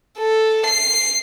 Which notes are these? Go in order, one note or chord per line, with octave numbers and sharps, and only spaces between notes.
A4
C7